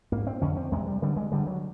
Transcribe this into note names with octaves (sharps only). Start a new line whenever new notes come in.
G#2 A#3
C4
F2 D3 C#4
C4
E2 C3 G#3
G3
G2 D3 G3
G#3
G2 D3 G3
F#3